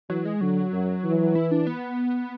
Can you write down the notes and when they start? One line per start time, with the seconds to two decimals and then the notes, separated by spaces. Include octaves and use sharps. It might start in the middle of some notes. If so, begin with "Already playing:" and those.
0.09 E3 F#3
0.25 G#3
0.41 D3 F#3
0.72 F#2
1.04 E3
1.35 E4
1.51 D4
1.67 B3